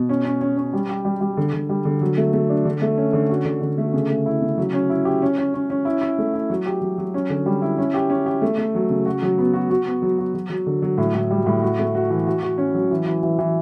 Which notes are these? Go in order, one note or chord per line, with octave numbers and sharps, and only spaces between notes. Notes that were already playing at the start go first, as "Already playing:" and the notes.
Already playing: B2
C#4
C#4
C#4
C#4
G3
G4
G3
G3
D3
D3
G3
D3
F#3
A3
A3
D4
D3
A3
C#4
D3
F#4
D3
D3
A3
C#3
A3
E4
C#3
F#3
C#4
E4
G4
C#4
C#4
C#4
C#4
E4
E4
A3
E4
F#3
G4
F#3
F#3
C#4
D3
G3
E4
C#4
G4
C#4
G4
A3
A3
F#3
C#3
F#4
F#3
B3
F#4
F#4
B3
F#3
F#4
F#3
F#3
D3
F#3
A2
A2
G3
A2
F#4
A3
F#4
E3
F#4
F#4
C#4
F#3
E3
E3
E3
E3